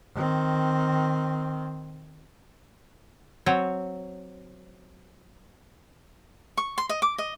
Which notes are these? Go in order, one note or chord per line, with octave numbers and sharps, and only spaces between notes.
D#3 C4
F#3 C4 C#5
C#6
C6
D#5
D6
D#5